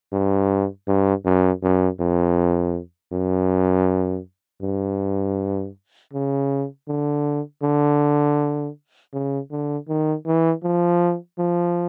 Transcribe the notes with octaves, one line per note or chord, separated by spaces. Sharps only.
G2
G2
F#2
F#2
F2
F#2
G2
C#3
D3
D3
C#3
D3
D#3
E3
F3
F3